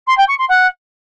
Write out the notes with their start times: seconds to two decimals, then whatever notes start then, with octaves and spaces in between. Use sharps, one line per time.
0.07 C6
0.17 G5
0.28 C#6
0.38 C6
0.49 F#5